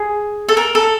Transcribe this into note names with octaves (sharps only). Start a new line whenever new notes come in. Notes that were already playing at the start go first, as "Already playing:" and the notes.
Already playing: G#4
A4
A#4
A4